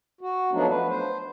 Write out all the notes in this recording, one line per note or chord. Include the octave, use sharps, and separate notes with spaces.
F#4
F3 F#3 A3 B3 D4 D#4
B4
C5